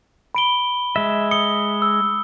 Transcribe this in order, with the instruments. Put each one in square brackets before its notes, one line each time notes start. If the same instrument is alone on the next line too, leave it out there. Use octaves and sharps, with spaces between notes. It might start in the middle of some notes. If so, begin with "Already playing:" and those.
[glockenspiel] B5 D7 G7
[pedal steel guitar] G#3 E5
[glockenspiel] D#6 C#7 G7
E6